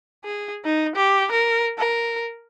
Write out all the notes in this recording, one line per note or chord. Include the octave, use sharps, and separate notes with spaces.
G#4
D#4
G4
A#4
A#4